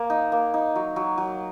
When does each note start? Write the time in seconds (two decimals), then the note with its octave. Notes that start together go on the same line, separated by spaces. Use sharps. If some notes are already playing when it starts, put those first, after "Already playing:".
Already playing: A#3
0.10 D#4
0.32 A#3
0.54 D#4
0.76 F#3
0.96 F#3
1.18 F#3